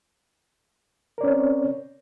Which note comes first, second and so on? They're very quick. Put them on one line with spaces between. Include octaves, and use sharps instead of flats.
A#4 D5 C#4 C#5 C4